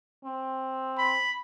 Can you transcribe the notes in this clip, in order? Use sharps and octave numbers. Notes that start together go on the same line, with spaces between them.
C4
B5